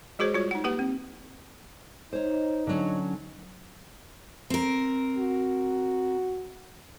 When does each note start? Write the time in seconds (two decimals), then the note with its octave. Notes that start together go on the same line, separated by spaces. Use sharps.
0.19 G#3 F#4 G#4 C5 C#5
0.34 G3 F4 F#4 C#5
0.51 D#4 F#5
0.64 A#3 G4 B4 F#5
0.79 C4
2.13 D#4 C5 C#5
2.67 D3 F#3 C#4
4.50 C4 A#4
5.17 F#4